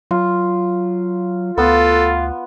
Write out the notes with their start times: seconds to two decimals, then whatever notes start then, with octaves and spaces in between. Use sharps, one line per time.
0.11 F#3 F4
1.58 D2 B3 F4 A4